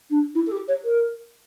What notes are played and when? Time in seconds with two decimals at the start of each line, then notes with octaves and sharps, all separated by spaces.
0.10 D4
0.34 E4
0.46 A4
0.51 G4
0.68 C#5
0.84 A#4